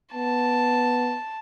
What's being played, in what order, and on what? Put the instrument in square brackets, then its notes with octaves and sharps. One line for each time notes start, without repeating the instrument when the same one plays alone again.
[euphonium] B3 [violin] A5